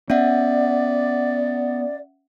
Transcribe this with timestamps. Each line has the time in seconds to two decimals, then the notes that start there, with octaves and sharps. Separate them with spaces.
0.10 B3 C#4 D5 E5 F#5